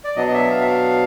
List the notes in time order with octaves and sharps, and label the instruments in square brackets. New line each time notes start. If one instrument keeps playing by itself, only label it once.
[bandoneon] D5
B2 F#3 B3 D4 D#5
D#5
E5
F5
E5
F5